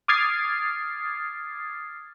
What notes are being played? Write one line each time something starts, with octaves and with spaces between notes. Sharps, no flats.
D6 D#6 F6 G#6 A6 C7